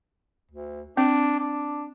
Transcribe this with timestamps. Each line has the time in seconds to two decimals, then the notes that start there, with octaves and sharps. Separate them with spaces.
0.51 D2
0.97 C4 D4
1.39 D4